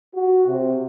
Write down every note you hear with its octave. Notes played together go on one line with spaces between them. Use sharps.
F#4
C3